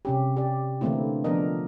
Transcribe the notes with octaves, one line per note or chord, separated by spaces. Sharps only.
C3 C#4 G4
G4 D5
D3 E3 A3 A#3 C4 E4
F3 B3 D4 A#4 D#5